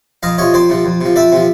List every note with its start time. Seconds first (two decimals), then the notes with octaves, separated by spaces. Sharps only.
0.23 F2 D#5 F5
0.38 C3 F3 C#5 D#5
0.54 F2 C5 D5
0.69 C3 F3
0.85 F2
1.01 C3 F3
1.16 F2 D5 E5
1.32 C3 F3